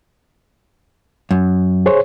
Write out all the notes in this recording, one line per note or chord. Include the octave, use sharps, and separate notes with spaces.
F#2
G#4 C5 C#5